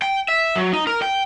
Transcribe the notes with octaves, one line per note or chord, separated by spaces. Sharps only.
G5
E5
F#3
D#4
A#4
G5